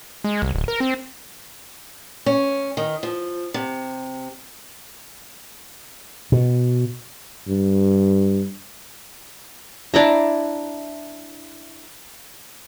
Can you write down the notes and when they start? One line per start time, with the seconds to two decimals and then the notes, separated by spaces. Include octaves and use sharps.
0.24 G#3
0.42 C2
0.55 D1
0.68 A#4
0.80 C4
2.26 C#4
2.77 D#3
3.03 F3
3.54 C3
6.32 B2
7.47 G2
9.94 D4 E4 A#5